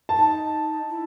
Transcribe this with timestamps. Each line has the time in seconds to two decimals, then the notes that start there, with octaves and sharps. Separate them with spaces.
0.09 A5
0.16 D#4
0.89 E4